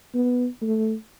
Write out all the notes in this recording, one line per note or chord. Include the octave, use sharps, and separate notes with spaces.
B3
A3